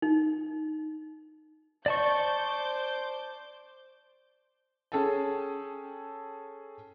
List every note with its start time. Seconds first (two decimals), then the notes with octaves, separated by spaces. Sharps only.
0.02 D#4
1.86 C5 D5 A5 C#6 D6 G6
4.92 C#4 G#4 A4 G5 A5